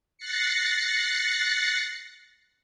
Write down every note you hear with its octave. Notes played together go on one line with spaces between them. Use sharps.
F#6 A6 A#6 C7 C#7